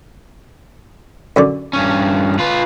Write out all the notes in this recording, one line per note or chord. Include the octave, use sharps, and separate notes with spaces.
F#2 D3 D5
G2 C#4
F4 B4